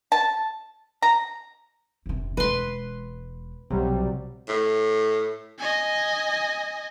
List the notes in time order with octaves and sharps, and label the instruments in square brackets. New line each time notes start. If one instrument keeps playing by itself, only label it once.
[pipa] A5
A#5
[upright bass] F1 C3
[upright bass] E1 G#3 [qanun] B4 C6
[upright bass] B1 [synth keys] C3 F#3 G3
[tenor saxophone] A2
[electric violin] D#5 G#5